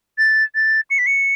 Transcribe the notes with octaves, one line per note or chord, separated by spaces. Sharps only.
A6
A6
C#7
B6
C#7